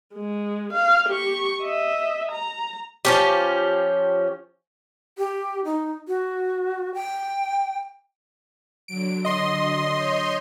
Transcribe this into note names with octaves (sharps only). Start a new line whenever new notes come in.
G#3
F5
G4 C#6
D#5 E5
A#5
F3 C#4 G4
G4
D#4
F#4
G5
D3 F#3 D7
D#5 C6
C#5 G6